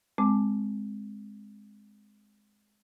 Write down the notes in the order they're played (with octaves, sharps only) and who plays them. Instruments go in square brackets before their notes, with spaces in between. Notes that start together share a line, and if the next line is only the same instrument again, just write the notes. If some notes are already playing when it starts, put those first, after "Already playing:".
[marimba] G#3 C4 A5 D6